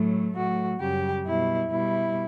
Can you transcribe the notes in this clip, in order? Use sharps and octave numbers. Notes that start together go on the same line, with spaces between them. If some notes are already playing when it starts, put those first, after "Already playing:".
Already playing: A2 F#3 A3
A2 F#3 A3 F#4
F#2 C#3 G3 G4
B2 G3 E4
B2 G3 E4